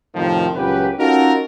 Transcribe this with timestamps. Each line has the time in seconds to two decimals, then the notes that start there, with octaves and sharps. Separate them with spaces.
0.15 F2 A2 C3 D#3 F3
0.55 C#2 A#2 C#3 F#3 G4 B4
0.99 C#4 D#4 F4 F#4 A4 A#4